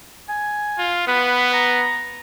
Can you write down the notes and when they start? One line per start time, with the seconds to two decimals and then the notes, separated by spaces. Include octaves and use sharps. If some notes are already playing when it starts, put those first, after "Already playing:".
0.29 G#5
0.78 F4
1.07 B3 B4
1.53 A#5